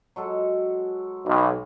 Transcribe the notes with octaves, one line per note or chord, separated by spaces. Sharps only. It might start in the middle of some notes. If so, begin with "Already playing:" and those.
F#3 G#3 A4
B1